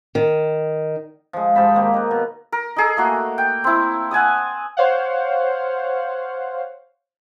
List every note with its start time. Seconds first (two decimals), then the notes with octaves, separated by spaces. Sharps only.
0.15 D#3
1.33 F3 G#3
1.55 G#2 G4 A5 B5
1.75 D#3 A#3 G4
1.94 B4 D#5
2.11 B2
2.52 A#4
2.76 D#4 G#4 A4
2.97 A3 A#3 F#4
3.38 G5
3.64 C4 E4
4.11 F#5 G#5 A5 D#6
4.77 C5 C#5 F5 F#5